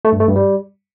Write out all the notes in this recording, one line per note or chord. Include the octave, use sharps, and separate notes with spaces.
A3
G2
A3
G2
G3